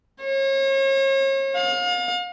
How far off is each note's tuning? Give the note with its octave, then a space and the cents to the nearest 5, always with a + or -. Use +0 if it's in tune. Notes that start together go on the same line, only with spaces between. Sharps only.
C#5 -40
F5 +35